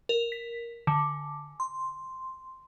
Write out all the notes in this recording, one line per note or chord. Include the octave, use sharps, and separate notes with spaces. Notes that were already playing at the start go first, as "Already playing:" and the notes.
A#4
B6
D3
C6